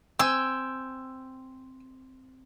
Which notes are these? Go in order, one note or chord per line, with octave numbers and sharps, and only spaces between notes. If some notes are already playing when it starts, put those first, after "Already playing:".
C4 G5 G#5 E6